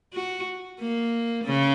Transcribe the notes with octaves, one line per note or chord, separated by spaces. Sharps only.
F#4
A#3
C#3